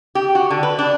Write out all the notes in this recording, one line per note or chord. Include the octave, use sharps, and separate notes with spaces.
G4
F#4
D3
B4
D4